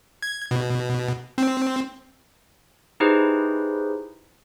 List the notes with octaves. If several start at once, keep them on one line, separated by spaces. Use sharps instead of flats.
G#6
B2
C4
D#4 E4 G4 G#4 B4 C5